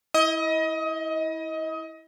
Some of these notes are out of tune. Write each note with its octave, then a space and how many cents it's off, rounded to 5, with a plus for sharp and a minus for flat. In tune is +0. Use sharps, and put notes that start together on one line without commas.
E4 -20 D#5 +25